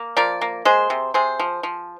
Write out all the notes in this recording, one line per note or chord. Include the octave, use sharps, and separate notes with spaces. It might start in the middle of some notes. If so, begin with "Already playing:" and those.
Already playing: A#3
F3 A#4 D5
A#3
G#3 G#4 C5
C3
C3 G#4 C5
F3
F3